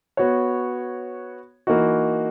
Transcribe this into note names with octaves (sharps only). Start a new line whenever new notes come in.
B3 F#4 C#5
E3 A#3 D#4 F#4